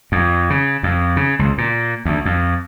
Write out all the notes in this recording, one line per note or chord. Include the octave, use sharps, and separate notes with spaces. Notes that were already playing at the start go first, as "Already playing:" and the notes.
F2
C#3
F2
C#3
C#2
A#2
D2
F2